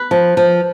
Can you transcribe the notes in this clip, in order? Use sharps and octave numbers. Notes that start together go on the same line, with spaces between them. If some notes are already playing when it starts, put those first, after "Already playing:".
Already playing: B4
F3
F3